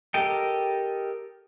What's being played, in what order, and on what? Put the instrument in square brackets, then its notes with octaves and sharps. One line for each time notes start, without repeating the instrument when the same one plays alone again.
[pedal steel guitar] G4 A4 A#4 D#5 G5